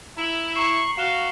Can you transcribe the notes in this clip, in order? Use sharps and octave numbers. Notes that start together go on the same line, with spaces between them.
E4 A#5 F#7
A#5 C#6 C7
F#4 F5 C7 E7 G7